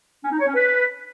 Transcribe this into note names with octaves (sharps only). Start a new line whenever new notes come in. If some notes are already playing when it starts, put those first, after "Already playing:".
C#4
D#4
C#5
C#4
B4